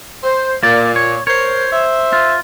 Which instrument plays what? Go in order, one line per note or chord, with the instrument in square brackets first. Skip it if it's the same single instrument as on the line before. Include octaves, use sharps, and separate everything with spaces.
[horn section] C5
[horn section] A#2 [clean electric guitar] A#3 D5
[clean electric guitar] C#5
[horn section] A#4 C5 [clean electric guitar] C#5
[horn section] C5 E5
[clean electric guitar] F4